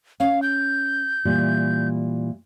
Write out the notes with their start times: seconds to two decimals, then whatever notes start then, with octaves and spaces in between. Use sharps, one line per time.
0.20 C#4 F5
0.42 G6
1.25 A#2 E3 G3